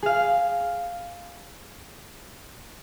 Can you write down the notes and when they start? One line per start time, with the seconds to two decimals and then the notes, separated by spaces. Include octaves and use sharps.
0.03 G#4 F5